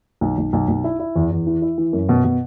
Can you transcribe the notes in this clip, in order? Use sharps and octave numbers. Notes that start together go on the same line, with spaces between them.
B1
B1
B1
B1
E4
E4
E2
E2
E3
E4
E3
F#2
B2
B2